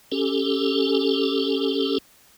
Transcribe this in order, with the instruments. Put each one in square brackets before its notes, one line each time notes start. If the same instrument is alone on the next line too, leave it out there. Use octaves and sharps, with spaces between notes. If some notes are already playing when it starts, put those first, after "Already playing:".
[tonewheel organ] C#4 G4 A4